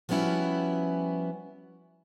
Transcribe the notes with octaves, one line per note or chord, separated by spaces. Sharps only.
F3 G3 B3 C#4 E4 F#4